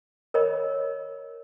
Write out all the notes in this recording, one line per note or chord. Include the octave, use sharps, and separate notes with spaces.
A#4 C#5 D#5 B5